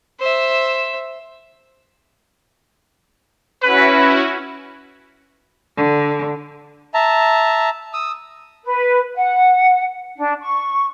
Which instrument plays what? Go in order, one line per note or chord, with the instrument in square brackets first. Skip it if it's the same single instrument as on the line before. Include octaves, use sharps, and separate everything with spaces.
[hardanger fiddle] C5 E5
[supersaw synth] C#4 E4 F#4 [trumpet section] B4
[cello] D3
[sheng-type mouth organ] E5 A5 A#5
D#6 E6
[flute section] B4
F#5
D4
C#6